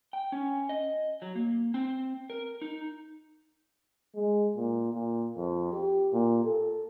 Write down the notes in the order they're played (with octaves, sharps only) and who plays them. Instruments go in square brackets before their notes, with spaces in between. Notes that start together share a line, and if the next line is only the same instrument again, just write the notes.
[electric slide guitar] G5
C#4
D#5
F#3
A#3
C4
A#4
D#4
[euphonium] G#3
A#2
A#2
F2
G4
A#2
A4